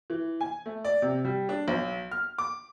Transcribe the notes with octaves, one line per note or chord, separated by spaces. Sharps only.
E3
G#5
A3
D5
C3
G3
D4
B1
F6
D6